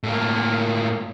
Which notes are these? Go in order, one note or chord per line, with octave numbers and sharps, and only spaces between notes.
A2 A#3